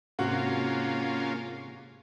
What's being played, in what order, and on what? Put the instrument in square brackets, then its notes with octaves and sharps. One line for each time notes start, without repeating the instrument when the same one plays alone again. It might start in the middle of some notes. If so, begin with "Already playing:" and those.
[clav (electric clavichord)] G#2 C3 [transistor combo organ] A#3 C#4 F4 [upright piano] F#4